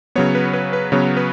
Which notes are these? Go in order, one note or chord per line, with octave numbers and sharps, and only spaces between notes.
C#3 F#3 B3 C#5
B4
B4
B4
C#3 F#3 B3 C#5
B4